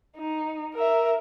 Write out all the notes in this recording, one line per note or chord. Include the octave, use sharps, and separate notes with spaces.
D#4
A#4 E5